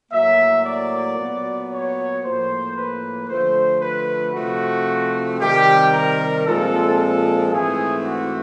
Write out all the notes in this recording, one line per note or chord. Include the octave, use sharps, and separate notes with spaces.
A2 F#3 A#3 E5
D5
A#2 F#3 B3
C#5
A2 F3 A#3 C5
B4
D3 F3 A3 C5
B4
C3 F3 A3 C4 F#4
C3 D#3 G3 G4
A#4
A#2 F3 G#3 C4 A4
A4
G#2 E3 A3 C4 G#4
F#4